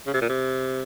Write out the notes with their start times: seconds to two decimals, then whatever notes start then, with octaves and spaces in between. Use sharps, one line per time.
0.07 C#3
0.14 C3
0.21 A#2
0.29 C3